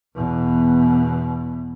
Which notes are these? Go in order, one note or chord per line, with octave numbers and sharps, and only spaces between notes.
E2 B2